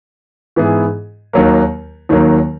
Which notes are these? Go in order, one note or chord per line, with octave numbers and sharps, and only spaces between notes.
G#2 E3 B3 E4 G#4
D#2 D#3 F#3 A#3
D#2 D#3 F#3 A#3